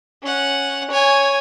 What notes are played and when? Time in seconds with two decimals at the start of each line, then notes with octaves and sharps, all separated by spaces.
0.22 C#4 F#5
0.91 C#5 G#5